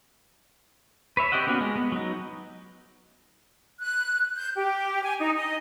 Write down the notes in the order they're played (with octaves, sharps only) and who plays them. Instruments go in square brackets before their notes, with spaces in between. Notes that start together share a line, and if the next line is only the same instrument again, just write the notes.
[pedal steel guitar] B4 C#5 E5
C4 G4 D5 D#5 F#5
A#3 B3 C#4 F#4
G#3
B3
F#3 D#4
[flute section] F#6
G6
G4
G#5
D#4
D#5